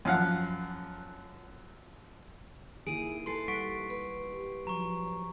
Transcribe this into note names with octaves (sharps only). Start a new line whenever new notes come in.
F#2 F3 F5 F#5
D#3 A#3 E4 G#4 D7 D#7
E3 A4 C6 C7
G3 F#5 C#6 B6 D7
B4
G4
F3 F#3 A#5 C#6